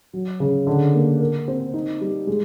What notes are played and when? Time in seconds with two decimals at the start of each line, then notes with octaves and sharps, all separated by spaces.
0.13 F#3
0.40 C#3
0.67 D3
0.94 A#3
1.20 A#4
1.48 C4
1.74 D#4
2.01 G3
2.27 G#3